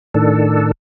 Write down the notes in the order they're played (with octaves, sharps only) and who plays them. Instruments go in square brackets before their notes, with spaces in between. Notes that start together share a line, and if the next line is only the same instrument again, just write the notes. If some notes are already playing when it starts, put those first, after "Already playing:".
[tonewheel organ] A2 D#3 D4 A4